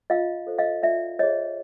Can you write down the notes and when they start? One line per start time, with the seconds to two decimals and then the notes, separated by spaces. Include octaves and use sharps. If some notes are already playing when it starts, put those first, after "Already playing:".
0.10 F4 D#5 F5
0.47 A4 C5
0.58 D#5 F5
0.82 F4 D5 E5
1.19 G#4 C5 C#5 D#5